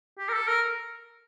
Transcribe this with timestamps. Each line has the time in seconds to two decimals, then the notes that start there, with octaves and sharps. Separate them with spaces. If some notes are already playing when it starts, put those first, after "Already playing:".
0.19 G4
0.29 A#4
0.33 A4
0.48 A#4